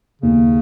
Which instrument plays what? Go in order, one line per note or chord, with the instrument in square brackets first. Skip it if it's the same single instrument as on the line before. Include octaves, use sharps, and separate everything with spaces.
[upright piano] D#2 [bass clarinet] C#3